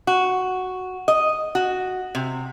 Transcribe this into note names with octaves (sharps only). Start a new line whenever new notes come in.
F#4
D#5
F#4
C3